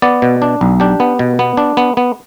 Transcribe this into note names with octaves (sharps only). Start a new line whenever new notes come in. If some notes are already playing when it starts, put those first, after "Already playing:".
B3 D5
B2
D4
B1
D4 G4
B3
B2
B3
D4
B3
B3